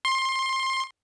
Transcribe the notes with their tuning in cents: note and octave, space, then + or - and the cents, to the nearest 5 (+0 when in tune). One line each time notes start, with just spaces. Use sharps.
C6 +20